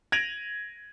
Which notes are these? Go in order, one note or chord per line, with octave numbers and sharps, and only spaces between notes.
G#6 A#6 D7 D#7 F7 F#7